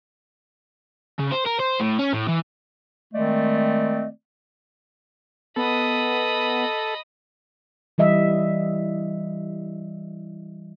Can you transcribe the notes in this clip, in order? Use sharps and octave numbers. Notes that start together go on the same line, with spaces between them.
C#3
C5
A#4
C5
A2
C#4
A2
E3
D#3 G#3 A3 C4 D5 D#5
B3 A4 D#5 B5
E3 G3 D#5 E5